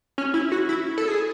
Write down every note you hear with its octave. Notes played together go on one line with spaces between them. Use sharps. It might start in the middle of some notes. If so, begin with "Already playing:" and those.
C#4
E4
F#4
E4
A4
G#4